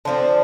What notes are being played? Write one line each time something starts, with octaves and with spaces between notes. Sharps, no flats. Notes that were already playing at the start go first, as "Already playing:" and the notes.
D3 F3 C4 D4